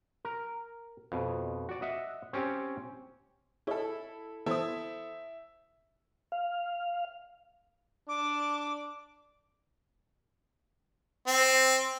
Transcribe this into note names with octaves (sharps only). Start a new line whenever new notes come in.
A#4
F2 B2
F#4 D5
D#5 E5 F#5
C4 C#4 G4 C#5 G5
E4 G#4 A4 C#5 D#5
E3 B3 E4 A4 C5 E5 D#6
F5
D4 D6
C4